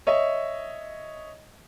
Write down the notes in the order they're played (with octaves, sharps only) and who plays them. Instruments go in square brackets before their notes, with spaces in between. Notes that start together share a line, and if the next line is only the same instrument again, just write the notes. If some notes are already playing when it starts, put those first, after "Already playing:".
[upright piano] C#5 D#5 E5